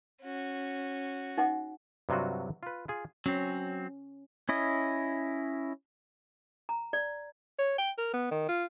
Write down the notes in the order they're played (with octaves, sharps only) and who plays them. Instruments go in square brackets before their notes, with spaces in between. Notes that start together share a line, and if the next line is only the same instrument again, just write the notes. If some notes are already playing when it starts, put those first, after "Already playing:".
[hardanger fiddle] C#4 F#4
[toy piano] D#4 F#5
[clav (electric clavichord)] G2 C3 F#3 F4 F#4
F4 B4
F4 G#4
[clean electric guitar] F#3 C4 [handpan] C#4
[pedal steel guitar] C#4 E4 D#5
[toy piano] A#5
D5
[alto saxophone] C#5
G5
A#4
B3
D#3
F4